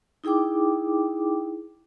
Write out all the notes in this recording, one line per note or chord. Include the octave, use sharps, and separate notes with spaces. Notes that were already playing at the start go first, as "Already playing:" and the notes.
D#4 E4 G#4 G5 D6